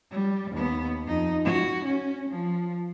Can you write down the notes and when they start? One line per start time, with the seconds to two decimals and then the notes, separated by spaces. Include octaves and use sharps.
0.11 G3
0.52 D#2 B3
1.07 F2 D#4
1.45 F#4
1.85 C#4
2.30 F3